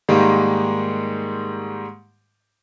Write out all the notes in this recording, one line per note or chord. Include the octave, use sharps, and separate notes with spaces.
G#2 D#3 G3 G#3 A#3 G4